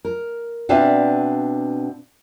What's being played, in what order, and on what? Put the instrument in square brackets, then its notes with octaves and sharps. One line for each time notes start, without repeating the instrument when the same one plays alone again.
[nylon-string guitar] A#4
B2 C4 D4 B4 E5 F5